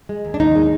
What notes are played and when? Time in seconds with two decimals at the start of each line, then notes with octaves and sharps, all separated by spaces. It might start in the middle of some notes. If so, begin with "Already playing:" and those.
0.09 G#3
0.25 D#2
0.34 D4
0.40 D#2 D#4
0.55 G#3